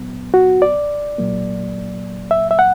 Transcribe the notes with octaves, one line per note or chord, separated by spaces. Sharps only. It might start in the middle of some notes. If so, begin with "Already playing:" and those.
Already playing: A#2 F#3 B3
F#4
D5
A#2 F#3 A#3
E5
E5
F#5